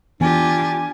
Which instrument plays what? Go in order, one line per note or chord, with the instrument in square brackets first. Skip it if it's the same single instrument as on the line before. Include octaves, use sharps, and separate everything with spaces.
[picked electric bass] E3 B3 [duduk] D4 [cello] F4 G4 [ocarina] G#5